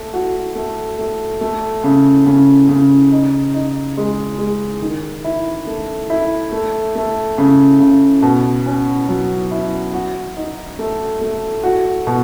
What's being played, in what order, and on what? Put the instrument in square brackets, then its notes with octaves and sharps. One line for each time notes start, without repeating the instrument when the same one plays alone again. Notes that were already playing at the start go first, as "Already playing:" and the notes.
Already playing: [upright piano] A3
F#4
A3
A3
A3
C#3
C#3
C#3
D#4
D#4
G#3
G#3
D#3
E4
A3
E4
A3
A3
C#3
C#3
B2
C#4
F#3
E4
F#4
D#4
A3
A3
F#4
B2